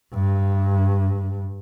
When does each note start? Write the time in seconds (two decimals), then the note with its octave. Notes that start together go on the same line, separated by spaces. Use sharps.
0.14 G2